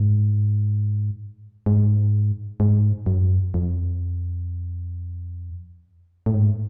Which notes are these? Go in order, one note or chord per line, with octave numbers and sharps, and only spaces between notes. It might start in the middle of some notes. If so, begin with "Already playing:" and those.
Already playing: G#2
G#2
G#2
F#2
F2
A2
G#2